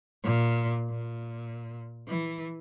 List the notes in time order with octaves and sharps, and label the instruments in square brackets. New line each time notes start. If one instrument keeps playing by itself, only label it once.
[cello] A#2
A#2
E3